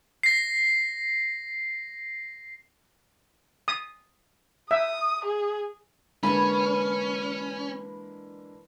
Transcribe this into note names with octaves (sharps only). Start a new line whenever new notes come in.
A#6 C7
D#6
E5 D#6
G#4
D3 E3 G#3 A#3 C#4 D4 B5